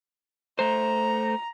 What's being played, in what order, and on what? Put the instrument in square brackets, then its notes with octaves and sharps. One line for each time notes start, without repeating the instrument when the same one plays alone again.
[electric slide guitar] A3 C5 [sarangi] A#5